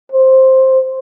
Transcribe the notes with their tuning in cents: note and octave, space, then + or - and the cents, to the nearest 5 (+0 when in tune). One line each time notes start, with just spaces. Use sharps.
C5 +10